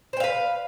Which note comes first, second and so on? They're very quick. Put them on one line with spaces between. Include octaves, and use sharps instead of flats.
C5 G5 F5 B4